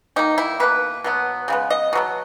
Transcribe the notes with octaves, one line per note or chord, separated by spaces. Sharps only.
D#3 A#3 D#4
E4
B2 A#3 B4
B2 F#3 B3
C#3 G#3 B3
D#5
B2 F#3 B3